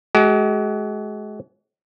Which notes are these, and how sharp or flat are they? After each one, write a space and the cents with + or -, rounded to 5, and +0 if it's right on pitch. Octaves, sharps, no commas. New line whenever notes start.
G#3 +35 F#4 +45